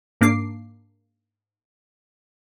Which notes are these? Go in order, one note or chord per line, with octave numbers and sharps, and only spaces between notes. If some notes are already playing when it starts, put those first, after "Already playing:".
G#2 A#3 D4 D6 C7